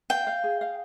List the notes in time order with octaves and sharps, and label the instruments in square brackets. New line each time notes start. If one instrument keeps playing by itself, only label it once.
[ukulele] F5 [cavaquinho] G5
[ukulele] F5
G#4
F5